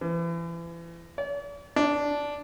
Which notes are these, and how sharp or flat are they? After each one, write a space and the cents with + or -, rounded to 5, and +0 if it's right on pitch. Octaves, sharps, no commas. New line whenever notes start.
E3 +35
D5 -45
D4 -10